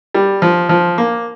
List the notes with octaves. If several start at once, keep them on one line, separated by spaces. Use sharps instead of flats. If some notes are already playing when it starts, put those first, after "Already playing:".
G3
F3
F3
A#3